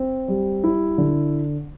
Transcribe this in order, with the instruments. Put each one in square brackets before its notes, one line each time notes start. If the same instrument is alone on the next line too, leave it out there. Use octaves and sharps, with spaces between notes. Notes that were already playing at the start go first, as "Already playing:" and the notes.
Already playing: [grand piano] C4
G3
E4
D3